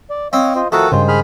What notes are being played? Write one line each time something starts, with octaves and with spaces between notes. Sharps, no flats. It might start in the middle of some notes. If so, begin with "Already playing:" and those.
D5
C4 C#5 D#5 F5
F4 C5 D#5
D#3 F3 A3 F#4 A4 A#4
G2 C#3 G#3 F4 C5
G#4 B5 F6